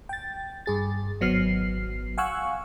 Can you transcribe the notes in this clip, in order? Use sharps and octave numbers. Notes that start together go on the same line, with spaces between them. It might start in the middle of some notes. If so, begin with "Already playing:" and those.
G5 A6
G2 G#4 A6
G#1 F#3 B3 F6 C7
F5 F#5 G#5 C#6 E6 F#6